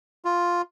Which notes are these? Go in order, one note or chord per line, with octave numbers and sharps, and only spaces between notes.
F4